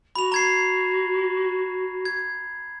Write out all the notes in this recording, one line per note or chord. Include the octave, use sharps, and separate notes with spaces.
F#4 B5 F7
A#5 G#6 C7
G#6